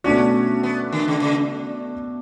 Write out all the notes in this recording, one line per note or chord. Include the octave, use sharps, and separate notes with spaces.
B2 A3 C#4 D4 F#4
B3
D3
C#3
C#3